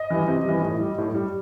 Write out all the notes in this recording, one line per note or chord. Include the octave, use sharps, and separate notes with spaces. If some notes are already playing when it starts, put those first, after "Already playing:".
Already playing: D#5
E3 G3
C3
E3 G3
A2
G3
A2
G3